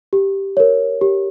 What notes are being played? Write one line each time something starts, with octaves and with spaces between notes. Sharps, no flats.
G4
A#4 C#5
G4